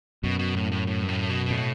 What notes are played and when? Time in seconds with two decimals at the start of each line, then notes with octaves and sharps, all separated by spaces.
0.24 F#2 B2
0.39 B2
0.55 A2
0.72 A2
0.87 A2
1.03 G2
1.08 A2
1.29 B2
1.50 A2